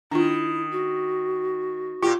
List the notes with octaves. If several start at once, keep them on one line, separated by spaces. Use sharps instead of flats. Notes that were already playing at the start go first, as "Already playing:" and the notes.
D#3 D4 E4 F4
F#4
A#2 F4 G4